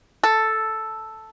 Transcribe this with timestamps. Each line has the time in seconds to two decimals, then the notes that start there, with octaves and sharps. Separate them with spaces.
0.24 A4